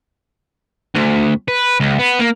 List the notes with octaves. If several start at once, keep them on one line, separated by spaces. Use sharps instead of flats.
D2
B4
C#2
B3
A#3